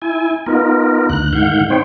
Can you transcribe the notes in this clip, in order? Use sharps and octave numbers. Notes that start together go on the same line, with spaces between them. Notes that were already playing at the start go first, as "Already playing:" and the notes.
E4 G#5
B3 D#4 F4 A#4
D2 F#6
G#2 D#3 F5 F#5 G6
C4 D#4 C5 C#5 G5